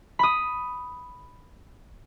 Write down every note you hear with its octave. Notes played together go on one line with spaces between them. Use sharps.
B5 D#6